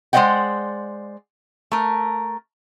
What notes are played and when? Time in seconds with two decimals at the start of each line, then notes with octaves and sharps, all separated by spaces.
0.13 G#3 C5 D5 D#5 F#5 G5
1.72 A3 A#4